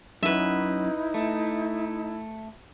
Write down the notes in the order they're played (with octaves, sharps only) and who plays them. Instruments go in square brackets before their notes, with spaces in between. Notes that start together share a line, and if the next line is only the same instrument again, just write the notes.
[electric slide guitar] F#2 [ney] D#4 [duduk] E4 [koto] B4 E5
[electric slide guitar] A3